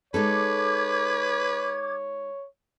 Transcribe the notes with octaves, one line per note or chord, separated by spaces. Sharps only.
G#3 D#4 A4 B4 C#5 D6 G#6